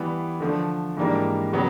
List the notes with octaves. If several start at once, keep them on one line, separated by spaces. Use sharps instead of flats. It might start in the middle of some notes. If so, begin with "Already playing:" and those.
Already playing: E3 G3 B3
D3 F3 A3
G#2 E3 G3 A#3 D4
C#3 F#3 B3